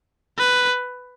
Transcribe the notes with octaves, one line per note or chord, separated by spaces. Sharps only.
B4